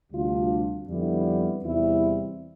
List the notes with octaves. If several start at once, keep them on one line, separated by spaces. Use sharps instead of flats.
D2 C3 G3 D4 F4
F2 D3 G3 B3 E4
E2 C3 G3 C4 E4